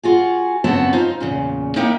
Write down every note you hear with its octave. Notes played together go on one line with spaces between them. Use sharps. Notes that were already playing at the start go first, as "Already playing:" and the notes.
F4 F#4 G#4
F#2 C#3 B3 C4 F#4 A5
D#4 F4 C5
E2 A#2 C#3
A#3 D#4 E4 A#4 G5